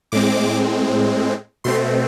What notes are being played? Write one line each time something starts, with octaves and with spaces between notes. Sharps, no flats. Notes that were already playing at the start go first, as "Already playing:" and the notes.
A2 G#3 C4 D6
B2 A3 C4 C6